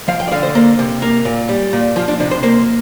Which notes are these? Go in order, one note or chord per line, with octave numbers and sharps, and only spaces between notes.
F3 F5
G5
D5
D3 F5
C5
A#3 C5
C3
A#3 A#4
A#2
G3
A#2
F3 F4
D4
C3 D4
C5
A#3 C5